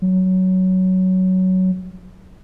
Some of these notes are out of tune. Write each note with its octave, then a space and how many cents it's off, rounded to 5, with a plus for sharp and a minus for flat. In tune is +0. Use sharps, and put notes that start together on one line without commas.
F#3 +10